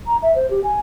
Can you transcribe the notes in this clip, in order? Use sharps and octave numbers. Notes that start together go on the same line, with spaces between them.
A#5
E5
C5
G4
G#5